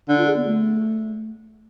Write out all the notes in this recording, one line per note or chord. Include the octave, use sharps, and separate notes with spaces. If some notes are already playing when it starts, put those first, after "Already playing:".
D3 D4
F4
G#4
B3
A3